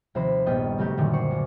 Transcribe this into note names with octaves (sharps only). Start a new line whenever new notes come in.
D#2 C3 F3 C4 C5 B5
A#1 G2 B3 C#4 D#5 G5
C#3 F#3 A3 G4 A#4
F#2 A#2 D3 D#3
C5 D5 C#6
C#2 D6